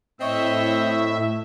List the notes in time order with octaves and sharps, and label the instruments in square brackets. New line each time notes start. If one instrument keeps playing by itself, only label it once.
[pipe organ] A2 E5 [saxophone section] C4 C#5 D#5